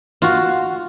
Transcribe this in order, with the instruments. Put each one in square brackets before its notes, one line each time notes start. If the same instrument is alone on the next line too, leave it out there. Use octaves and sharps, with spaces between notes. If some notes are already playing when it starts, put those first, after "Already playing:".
[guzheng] F4 F#4